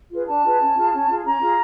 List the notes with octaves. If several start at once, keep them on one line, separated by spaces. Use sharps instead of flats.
F4 G#4 B4
D4 A5
F4 G#4 B4
C#4
F4 G#4
C#4
F4 G#4
C#4 A#5
F4 G#4